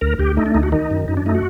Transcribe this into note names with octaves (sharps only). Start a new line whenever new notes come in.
D2 A#4
D2 G4
A3 D#4
D4
D2 D#4
F#4
D#3 D#4
F#2
F#2 D#4
D4
A3 D#4
F#4